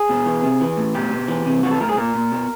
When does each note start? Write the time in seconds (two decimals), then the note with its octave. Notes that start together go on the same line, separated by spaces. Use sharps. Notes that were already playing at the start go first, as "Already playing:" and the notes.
Already playing: G#4
0.09 B2
0.26 E3
0.44 C3
0.61 E3
0.77 A2
0.94 B2 G4
1.11 B2
1.28 E3
1.46 C3
1.63 E3 F#4
1.71 A4
1.81 A2 A#4
1.89 G#4
1.98 A#2 A#4
2.15 A#2
2.32 B2